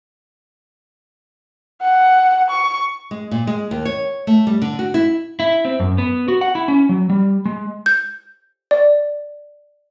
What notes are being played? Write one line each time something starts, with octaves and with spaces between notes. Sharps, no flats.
F#5
C#6
G#3
A#2
G#3
D#2
C#5
A3
G3
D3
F#4
E4
E4
C4
F#2
B3
F#4
F#5
E4
C#4
F#3
G3
G#3
G6
D5